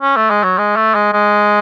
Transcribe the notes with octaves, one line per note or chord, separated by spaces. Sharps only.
C#4
A3
G#3
F#3
G#3
A3
G#3
G#3